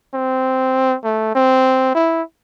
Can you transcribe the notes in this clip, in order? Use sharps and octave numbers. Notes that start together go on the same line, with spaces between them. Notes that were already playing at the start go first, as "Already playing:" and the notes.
C4
A3
C4
E4